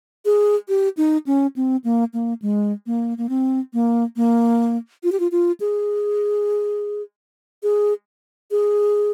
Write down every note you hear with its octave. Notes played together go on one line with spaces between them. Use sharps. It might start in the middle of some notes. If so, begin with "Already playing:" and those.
G#4
G4
D#4
C#4
C4
A#3
A#3
G#3
A#3
A#3
C4
A#3
A#3
F4
G4
F4
F4
G#4
G#4
G#4